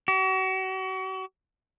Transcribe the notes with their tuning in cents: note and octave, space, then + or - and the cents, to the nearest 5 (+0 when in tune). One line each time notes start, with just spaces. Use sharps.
F#4 +35